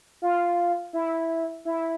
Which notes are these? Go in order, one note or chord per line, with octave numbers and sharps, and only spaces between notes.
F4
E4
E4